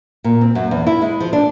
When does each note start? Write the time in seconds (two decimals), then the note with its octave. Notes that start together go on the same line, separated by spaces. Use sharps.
0.24 A#2
0.41 C4
0.55 F#2
0.71 E2
0.87 E4
1.02 G#3
1.20 F3
1.33 D4